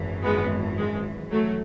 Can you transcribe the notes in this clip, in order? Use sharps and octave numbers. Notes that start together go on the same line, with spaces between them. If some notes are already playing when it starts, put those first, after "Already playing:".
Already playing: G#1 F#2 E3
G#3 B3
G#3
F#3 A3